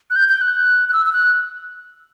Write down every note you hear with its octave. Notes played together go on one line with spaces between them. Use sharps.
F#6
G6
G6
F#6
F#6
E6
E6
F#6